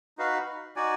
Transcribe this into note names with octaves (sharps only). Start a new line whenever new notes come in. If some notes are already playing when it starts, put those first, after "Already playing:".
D#4 F#4 B4 F5
D#4 F#4 D5 G#5